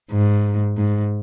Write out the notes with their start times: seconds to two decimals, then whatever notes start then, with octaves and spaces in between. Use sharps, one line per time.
0.11 G#2
0.77 G#2